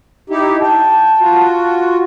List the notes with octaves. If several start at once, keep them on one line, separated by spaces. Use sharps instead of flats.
D#4 E4 G4
G5 A5
F4 F#4